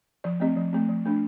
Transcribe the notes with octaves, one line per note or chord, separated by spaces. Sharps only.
F3 D5
A3 C4 D#5
F3
A3 C4
F3
A3 D4